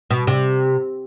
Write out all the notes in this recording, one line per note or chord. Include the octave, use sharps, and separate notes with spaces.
B2
C3